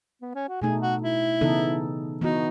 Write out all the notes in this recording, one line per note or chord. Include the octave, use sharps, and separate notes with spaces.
B3
C#4
F#4
B2 A3 D#4 G#4
F#4
E4
C#3 E3 B3 D#4 A4
E3 B3 D#4 F#4